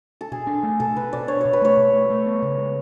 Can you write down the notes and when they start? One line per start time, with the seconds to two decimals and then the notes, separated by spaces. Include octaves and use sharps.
0.21 A4
0.32 B2 G#4
0.47 D4
0.63 A3
0.80 B2 A4
0.96 B2 B4
1.13 B2 D5
1.28 D4 C#5
1.41 B2 C#5
1.53 B4
1.61 A3 C#5
1.77 B2
1.93 A3
2.10 A3
2.26 B3
2.42 C#3
2.58 G#3